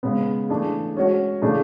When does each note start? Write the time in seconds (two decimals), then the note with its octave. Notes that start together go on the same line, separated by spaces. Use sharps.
0.03 C#3 G#3 B3
0.49 E3 A3 D4 G#4
0.95 G#3 C#4 F#4 C#5
1.42 C#3 E3 A3 D4 G#4